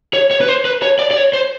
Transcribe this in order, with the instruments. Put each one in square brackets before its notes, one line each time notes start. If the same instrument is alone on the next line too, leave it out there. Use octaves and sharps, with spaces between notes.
[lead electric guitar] C#5
C#5
B4
C5
B4
C#5
D5
D5
C#5
C5